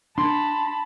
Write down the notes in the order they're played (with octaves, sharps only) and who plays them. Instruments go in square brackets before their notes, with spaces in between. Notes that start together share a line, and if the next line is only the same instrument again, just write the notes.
[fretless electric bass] D4 [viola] A5 B5 [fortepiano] C6